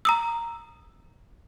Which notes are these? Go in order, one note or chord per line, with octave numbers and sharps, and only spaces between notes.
A#5 D#6 E6